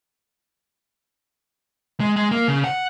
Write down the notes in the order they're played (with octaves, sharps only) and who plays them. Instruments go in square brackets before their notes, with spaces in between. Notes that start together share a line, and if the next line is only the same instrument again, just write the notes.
[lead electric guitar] G#3
G#3
A#3
C#3
F#5